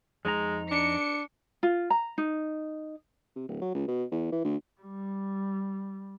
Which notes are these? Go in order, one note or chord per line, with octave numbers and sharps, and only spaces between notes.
F2 G#3 D#4 A#5
D4 C#7
F4
A#5
D#4
C3
D1
F#3
C#2
B2
E2
E3
D2
G3